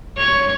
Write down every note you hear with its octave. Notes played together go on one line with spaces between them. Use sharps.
C#5